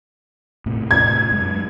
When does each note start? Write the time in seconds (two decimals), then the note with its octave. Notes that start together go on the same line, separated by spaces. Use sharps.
0.66 A2 C3
0.91 G#6
1.31 F#2 G#3